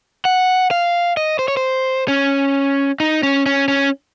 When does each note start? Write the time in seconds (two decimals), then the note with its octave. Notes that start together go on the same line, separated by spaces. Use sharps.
0.25 F#5
0.71 F5
1.17 D#5
1.39 C5
1.48 C#5
1.57 C5
2.08 C#4
3.00 D#4
3.23 C#4
3.46 C#4
3.68 C#4